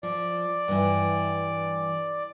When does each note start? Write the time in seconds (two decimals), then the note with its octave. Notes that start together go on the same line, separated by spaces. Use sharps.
0.03 F3 D5
0.68 G2 E3